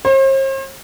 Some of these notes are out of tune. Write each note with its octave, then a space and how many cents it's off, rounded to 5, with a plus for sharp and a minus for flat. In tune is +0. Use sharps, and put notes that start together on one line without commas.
C5 +45